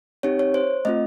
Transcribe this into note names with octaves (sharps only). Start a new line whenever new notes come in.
C4 D#4 G4 C#5
C#5
C5
A3 C4 F4 D#5